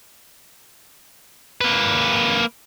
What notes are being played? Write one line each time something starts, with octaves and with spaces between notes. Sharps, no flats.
A#3 B4